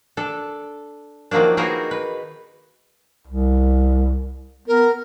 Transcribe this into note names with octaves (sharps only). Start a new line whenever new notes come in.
D4 A4
D#3 F3 F#3 A#3 D4
A#3 D#4 F#4 G#4 A#4 B4
B4
C2
B3 A#4